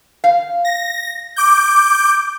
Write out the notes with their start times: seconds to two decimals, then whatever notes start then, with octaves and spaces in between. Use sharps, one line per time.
0.24 F5
0.65 A#6
1.36 D6 G6